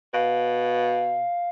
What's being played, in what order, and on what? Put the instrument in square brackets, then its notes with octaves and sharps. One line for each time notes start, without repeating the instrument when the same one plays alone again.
[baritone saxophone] B2 [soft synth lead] F5